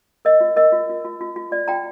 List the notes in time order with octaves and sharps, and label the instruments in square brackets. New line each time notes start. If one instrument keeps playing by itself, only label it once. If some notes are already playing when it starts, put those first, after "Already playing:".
[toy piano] A#4 D#5
F4
A#4 D#5
F4
F4
F4
F4
F4
F4 D5
F4 G5 A#5